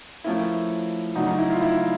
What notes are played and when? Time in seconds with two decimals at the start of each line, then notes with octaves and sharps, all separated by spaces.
0.24 F3 A3 C#4 E4 F4 A#4
1.15 C#3 F#3 A3 D4 D#4
1.27 D#4
1.38 E4
1.50 F4
1.61 E4